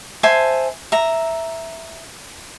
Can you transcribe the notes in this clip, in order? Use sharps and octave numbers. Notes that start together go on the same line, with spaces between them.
C5 E5 G#5 A5
E5 A#5